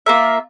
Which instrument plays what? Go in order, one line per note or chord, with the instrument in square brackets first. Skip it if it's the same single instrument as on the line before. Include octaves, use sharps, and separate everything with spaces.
[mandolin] A#3 F4 A#4 E5